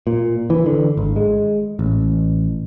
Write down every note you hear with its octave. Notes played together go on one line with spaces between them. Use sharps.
A#2
E3
D3
G#1
G#3
A1